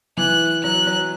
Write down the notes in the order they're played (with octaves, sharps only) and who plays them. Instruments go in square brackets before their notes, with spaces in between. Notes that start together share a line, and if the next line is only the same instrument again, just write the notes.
[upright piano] E3 [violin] F#6
[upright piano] F#3 [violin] F#6
[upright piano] F#3